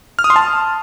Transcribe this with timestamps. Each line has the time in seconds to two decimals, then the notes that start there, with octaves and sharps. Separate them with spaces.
0.19 F6
0.24 D#6
0.30 C6
0.36 A5